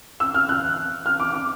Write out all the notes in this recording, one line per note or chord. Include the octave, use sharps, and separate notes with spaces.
E6
F6
F#6
F6
D6
D6